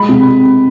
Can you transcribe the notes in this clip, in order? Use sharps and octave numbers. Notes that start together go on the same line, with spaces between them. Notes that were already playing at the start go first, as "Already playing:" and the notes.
Already playing: G#3 B5
C3